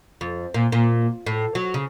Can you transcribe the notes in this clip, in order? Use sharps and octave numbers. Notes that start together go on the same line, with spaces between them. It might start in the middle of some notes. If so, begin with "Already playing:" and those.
F2
A#2
A#2
A2
F#3
C#3